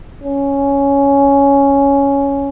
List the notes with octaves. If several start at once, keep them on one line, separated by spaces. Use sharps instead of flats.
C#4